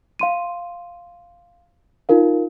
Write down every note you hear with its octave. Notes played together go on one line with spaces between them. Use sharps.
F5 C6 D#7
D#4 F4 A#4 F5